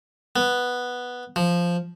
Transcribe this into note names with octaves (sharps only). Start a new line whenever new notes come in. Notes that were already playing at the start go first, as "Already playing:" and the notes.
B3
F3